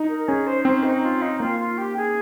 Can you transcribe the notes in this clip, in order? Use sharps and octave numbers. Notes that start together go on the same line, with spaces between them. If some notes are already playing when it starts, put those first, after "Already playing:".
Already playing: D#4
A#4
C#4 G#4
C5
C4 C5
D#4
F4
D#4
A#3 F4
F4
G4
G#4